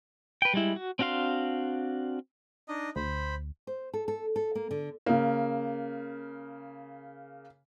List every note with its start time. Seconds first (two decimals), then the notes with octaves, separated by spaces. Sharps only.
0.42 B4 G5
0.54 G3 G#3 E4
0.76 F#4
0.99 C4 D4 F#4 F5 C6
2.68 D4 D#4 D#5
2.96 D2 C5 B5
3.67 C5
3.94 A4
4.08 A4
4.36 A4
4.55 A#3
4.71 D3
5.06 C#3 A#3